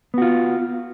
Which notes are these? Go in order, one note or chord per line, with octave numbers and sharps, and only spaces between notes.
B3 F4 F#4